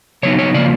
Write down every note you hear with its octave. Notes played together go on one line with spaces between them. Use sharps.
C#3 F#3 B3 D#4 C#5
C#5
C#3 F3 A#3 D5